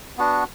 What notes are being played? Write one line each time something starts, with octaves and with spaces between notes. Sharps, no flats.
B3 D4 F#4